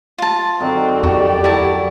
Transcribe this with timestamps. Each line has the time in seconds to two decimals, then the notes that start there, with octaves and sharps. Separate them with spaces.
0.18 F4 A5
0.60 F#2 D3 C4 D#4
1.03 F2 F#4 G4 D5
1.44 E4 F#4 A5